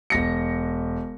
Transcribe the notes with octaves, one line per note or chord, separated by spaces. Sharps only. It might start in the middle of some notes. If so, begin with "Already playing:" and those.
E1 A#6 C#7